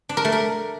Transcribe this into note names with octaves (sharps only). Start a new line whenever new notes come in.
D4
A#4
A3
A#4